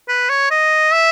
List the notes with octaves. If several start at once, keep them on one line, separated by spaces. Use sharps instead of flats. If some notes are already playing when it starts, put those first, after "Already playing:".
B4
C#5
D#5
E5